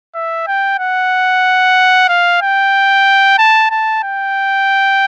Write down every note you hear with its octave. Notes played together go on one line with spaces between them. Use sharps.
E5
G5
F#5
F5
G5
A5
A5
G5